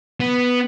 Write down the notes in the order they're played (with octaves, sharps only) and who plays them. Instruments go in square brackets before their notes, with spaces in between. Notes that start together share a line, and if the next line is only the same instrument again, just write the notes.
[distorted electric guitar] B3